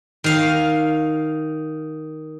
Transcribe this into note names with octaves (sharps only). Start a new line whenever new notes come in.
D#3 F5